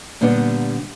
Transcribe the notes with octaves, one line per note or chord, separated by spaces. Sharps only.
A#2 D3 G3 B3 D4